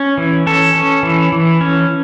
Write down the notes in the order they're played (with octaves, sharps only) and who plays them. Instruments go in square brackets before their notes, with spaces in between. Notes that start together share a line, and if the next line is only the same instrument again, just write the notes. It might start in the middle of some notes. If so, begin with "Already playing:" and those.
Already playing: [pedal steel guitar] C#4
E3
C#4 A4
C#4
E3
E3
C#4